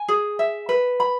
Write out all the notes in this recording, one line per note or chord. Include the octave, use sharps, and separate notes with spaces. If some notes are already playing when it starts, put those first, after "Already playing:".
Already playing: G#5
G#4
E5
B4
B5